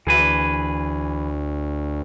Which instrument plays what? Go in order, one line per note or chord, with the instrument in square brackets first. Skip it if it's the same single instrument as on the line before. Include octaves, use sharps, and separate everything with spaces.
[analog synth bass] D2 [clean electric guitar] E3 G#4 B4